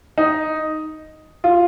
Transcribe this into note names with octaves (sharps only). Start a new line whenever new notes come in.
D#4
F4